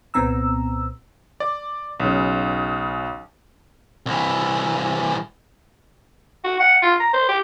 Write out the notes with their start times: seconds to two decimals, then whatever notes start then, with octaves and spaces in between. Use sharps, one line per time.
0.14 C2 A#2 B3 C4 A#5 E6
1.40 D5
2.00 B1 C#3
4.06 C2 E3
6.44 F#4
6.60 F#5
6.82 F4
7.00 A#5
7.13 C5
7.28 G4